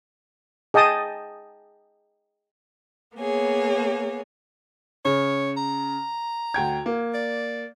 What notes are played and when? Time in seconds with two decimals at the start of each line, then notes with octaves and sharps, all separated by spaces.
0.74 G#4 D#5 G5 A5 D#6
3.17 A#3 B3 G#4 C#5
5.05 C#3 C#5
5.57 A#5
6.54 D2 G5 G#6
6.86 A#3
7.14 D5